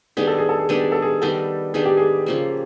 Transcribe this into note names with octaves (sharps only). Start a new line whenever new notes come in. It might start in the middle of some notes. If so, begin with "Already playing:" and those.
D#3 G3 B3 D4 G#4
A4
G#4
A4
G#4
D#3 G3 B3 D4 A4
G#4
A4
G#4
D#3 G3 B3 D4 A4
D#3 G3 B3 D4 G#4
G4
G#4
C#3 F3 A#3